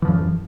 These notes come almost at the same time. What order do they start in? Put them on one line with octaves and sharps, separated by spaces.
E3 F3 F#2